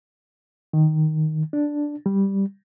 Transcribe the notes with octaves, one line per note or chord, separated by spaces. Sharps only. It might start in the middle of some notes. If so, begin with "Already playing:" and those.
D#3
D4
G3